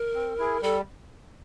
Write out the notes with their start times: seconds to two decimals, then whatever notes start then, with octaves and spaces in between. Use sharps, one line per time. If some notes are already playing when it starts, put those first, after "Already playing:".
Already playing: A#4
0.15 C4
0.38 E4 G#4
0.62 G3 A4